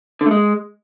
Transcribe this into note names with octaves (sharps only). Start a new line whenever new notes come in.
D3
A3
G#3